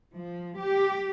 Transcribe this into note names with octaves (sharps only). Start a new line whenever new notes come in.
F3
G4